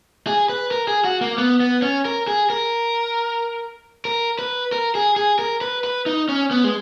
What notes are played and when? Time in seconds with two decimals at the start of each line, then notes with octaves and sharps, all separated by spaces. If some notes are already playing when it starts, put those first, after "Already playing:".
0.27 G#4
0.49 B4
0.71 A#4
0.88 G#4
1.04 F#4
1.21 A#3
1.38 B3
1.60 B3
1.82 C#4
2.05 A#4
2.28 G#4
2.50 A#4
4.05 A#4
4.39 B4
4.72 A#4
4.95 G#4
5.16 G#4
5.39 A#4
5.61 B4
5.84 B4
6.06 D#4
6.29 C#4
6.51 B3
6.64 G#3